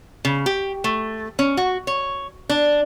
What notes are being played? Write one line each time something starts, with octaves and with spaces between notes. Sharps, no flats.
C#3
G4
A3
C#4
F#4
C#5
D4